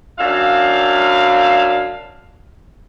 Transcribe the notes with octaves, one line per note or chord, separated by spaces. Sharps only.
F#2 D4 E5 F5